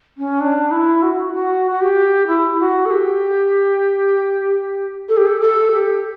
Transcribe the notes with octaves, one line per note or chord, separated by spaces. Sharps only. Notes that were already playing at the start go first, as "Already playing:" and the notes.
C#4
D4
E4
F#4
F#4
F#4
G4
E4
F#4
A4
G4
A4
G4
A4
A4
G4